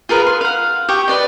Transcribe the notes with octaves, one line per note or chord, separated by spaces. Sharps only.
F4 G#4 A#4 B4
C6
F5 F#5
G4 C#6 D#6
B4 D5 D#5